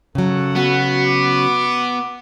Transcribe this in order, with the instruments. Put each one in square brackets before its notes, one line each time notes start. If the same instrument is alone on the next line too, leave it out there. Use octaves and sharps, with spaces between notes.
[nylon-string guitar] C#3 F#3 [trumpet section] A4 F#5
[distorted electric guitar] B3 [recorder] F#4
[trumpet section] D6